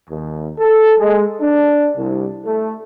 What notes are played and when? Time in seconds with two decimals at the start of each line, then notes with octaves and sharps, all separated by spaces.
0.10 D#2
0.58 A4
0.99 G#3
1.40 D4
1.97 C2
2.45 A3